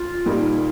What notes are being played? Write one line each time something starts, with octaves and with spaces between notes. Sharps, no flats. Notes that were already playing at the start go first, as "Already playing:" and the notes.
Already playing: F4
A#2 G3 A#3 D#4